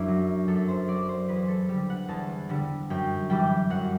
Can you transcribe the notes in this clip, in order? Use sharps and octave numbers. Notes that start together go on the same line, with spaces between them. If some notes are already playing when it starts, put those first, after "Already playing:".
Already playing: F#2 D4 E4
F#3
F#2 A4
C5
F#3 D5
C5
E2 B4
A4
D3 G3 G4
F#5
E2 A5
D3 G3
F#2 G5
E3 G3 G5
F#2 F#5